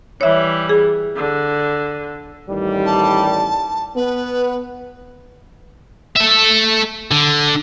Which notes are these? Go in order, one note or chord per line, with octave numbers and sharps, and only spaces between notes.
E3 G3 C#5 E5
G#4
D3
A1 D#3 G3
A5
B3 B4
A4 E5
D3